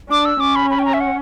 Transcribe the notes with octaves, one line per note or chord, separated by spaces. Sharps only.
D4 D6
E6
C#4 D6
B5
B5
G5
A#5
E5
F#5